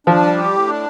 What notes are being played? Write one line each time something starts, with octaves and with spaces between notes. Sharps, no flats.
F3 D4
G3
G4
A2
D4